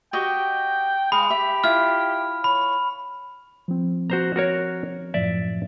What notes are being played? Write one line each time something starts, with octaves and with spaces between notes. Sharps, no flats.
F#4 G4 D#5 G5
G#3 F5 B5
G4 E5
E4 F4 F6
C#5 B5
F3 C4
F#4 C5 A#5
F#4 A#4 C#5
F#2 A2 F3 D5 E5